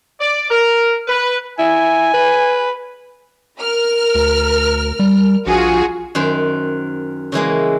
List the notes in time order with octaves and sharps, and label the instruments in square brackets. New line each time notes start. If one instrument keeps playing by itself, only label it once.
[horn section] D5
A#4
B4
[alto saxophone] E4 [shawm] G#5
[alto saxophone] B4
[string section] A#4 F6
[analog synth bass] D2
G3
[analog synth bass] A#1 [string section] F4 F#4 G#4
[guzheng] F#2 D#3 C5 G5
C#3 E3 G#3 A#3